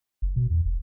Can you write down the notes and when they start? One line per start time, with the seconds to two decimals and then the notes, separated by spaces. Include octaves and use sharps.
0.22 F#1
0.36 B2
0.50 E2
0.65 F1